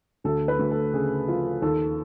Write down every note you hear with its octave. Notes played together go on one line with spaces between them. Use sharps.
D2 A4
B4
D2
A4
C#3 G#4
F3 F4
D#2 A4